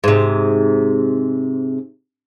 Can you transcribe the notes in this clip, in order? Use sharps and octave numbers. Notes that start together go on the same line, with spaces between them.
G#2 C3